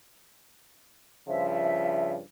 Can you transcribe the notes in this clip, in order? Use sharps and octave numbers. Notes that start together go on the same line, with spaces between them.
G2 C#3 F3 E5